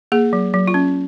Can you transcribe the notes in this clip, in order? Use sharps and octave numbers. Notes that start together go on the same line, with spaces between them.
A#3 G#4
F#3
F#3
F4
C#4